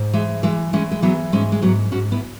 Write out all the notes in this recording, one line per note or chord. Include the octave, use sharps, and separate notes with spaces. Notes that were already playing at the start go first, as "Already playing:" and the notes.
Already playing: G#2
E3 G#3
E3 G#3
E3 G#3 C#4
G#3
E3 F#3 B3
G#2 G#3 C#4
G#3
G#2 F#3 B3
G#2 C#4 F#4
B3 E4